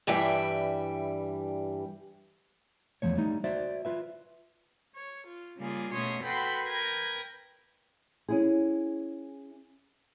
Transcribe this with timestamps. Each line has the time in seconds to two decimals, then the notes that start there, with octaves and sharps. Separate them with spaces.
0.07 G2 E3 G3 E5 G5
3.02 E2 A#2 F3 A3 C#5
3.17 G3 A3 D#4
3.44 F#4 C5 D5 E5
3.85 F4 B4 E5
4.95 C#5
5.27 F4
5.58 C#3 G3 A#3 F4 G#4
5.93 B2 A3 C#4 C#5 C6 D#6
6.25 F#4 A4 B4 G5 B5 C6
6.65 A#4 B4 G5 G#6 A#6
8.28 C#4 E4 G#4